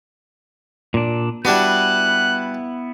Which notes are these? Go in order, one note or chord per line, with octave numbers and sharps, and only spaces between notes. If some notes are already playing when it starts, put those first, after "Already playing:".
A#2 D4
G3 B3 D4 E4 F#4 F#6